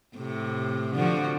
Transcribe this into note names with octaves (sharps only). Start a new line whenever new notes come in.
A2 C3
D3 F3 F#4